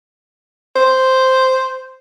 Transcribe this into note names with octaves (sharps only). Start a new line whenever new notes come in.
C5